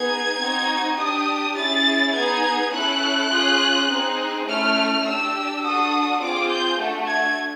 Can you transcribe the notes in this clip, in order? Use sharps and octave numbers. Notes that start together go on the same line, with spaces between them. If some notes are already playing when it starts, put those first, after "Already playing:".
Already playing: B3 D#4 G#4 G#6
C4 D#4 F#4
D4 G4 D#6
C#4 E4 G#4 A6
B3 D#4 G#4 G#6
C#4 E4 A4 F#6
C#4 F4 G#4
C4 D#4 G#4
A3 C#4 E4 F6
D4 G4 E6
D4 F#4 A4 D#6
C4 F4 G#4 D6
G6
A3 D4 F#4 A4
G#6